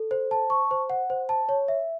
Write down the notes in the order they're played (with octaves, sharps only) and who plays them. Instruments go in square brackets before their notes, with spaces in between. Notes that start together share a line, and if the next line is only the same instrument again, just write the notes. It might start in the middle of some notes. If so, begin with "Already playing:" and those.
Already playing: [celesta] A4
C5
A5
C#6
C5
F#5
C5
A5
C#5
E5